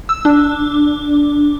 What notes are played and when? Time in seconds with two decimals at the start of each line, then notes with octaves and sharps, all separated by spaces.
0.09 E6
0.25 D4